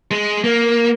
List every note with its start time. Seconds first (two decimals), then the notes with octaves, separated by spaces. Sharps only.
0.11 G#3
0.44 A#3